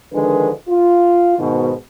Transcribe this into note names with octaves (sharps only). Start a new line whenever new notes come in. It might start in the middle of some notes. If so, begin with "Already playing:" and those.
D3 D#3 F3 G#3 D4 B4
F4
G#2 B2 D#3